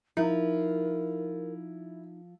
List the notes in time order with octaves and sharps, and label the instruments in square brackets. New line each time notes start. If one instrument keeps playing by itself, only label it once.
[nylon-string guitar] F3 [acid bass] D#4 [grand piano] E4 [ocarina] A#4